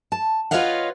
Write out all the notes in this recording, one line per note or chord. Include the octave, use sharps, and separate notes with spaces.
A5
F4 B4 C#5 D#5 F5 F#5